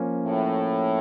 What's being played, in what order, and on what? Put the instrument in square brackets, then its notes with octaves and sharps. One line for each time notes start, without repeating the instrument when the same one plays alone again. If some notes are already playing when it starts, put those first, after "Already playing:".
Already playing: [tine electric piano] F3 A#3 C#4
[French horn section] A2